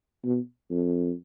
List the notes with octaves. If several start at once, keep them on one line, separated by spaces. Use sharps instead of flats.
B2
F2